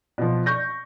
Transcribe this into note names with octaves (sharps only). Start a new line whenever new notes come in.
B2 F3
C#6 G6 A#6